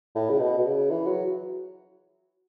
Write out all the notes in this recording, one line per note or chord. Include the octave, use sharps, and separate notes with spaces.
A2
C#3
B2
B2
C#3
E3
F#3